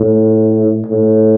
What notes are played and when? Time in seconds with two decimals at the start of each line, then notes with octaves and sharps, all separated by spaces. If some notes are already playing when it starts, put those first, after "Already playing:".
Already playing: A2
0.86 A2